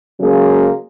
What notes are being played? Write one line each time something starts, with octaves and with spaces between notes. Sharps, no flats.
C#3 F#3 G#3 A#3 C#4